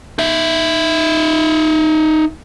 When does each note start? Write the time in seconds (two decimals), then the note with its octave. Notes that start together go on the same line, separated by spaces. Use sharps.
0.19 D#4 E5